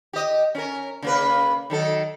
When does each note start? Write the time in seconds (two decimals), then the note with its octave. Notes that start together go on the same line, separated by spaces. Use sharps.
0.13 G4 D#5
0.55 C#4 A#4
1.02 C#3 A#3 B4
1.70 D#3 F#3 A4